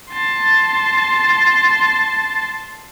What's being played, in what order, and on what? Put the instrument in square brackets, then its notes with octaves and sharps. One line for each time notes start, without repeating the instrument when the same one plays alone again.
[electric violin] A5 C6